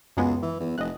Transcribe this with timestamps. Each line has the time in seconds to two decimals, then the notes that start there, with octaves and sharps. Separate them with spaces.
0.17 C#2 F#2 G#3 B3
0.42 E3
0.61 E2
0.78 F1 D#5 F#6